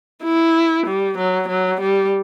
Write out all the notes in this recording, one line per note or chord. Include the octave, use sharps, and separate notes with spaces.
E4
G3
F#3
F#3
G3